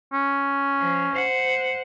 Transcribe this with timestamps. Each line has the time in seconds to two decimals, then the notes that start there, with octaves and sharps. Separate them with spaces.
0.13 C#4
0.80 F3
1.12 C5 F#5